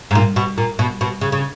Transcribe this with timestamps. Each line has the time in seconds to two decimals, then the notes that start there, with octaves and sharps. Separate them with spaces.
0.11 G#2
0.15 A#2
0.36 B2
0.58 A#2
0.79 B2
1.01 B2
1.21 C#3
1.32 C#3